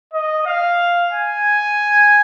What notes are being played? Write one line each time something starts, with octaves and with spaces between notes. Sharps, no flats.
D#5
F5
G#5